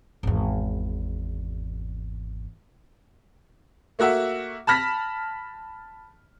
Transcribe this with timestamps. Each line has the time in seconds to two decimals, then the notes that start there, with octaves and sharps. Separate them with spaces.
0.23 G#1 E2
3.99 A3 A#3 F#4 E5 F#5
4.67 A5 B5 F6 A#6 B6